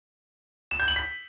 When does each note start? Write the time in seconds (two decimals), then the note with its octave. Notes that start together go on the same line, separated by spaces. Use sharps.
0.71 E7
0.80 G6
0.88 F#7
0.96 B6